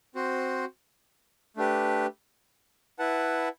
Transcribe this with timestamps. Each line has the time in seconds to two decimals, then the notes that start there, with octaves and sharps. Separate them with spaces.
0.15 C4 F#4 C5
1.57 A3 D4 G4 B4
2.99 E4 B4 F#5 A5